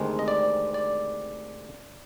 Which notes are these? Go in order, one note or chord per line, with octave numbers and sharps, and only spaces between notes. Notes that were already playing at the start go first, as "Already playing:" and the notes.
Already playing: D2 C3 D#3 G#3 C4
D#5
D5
D5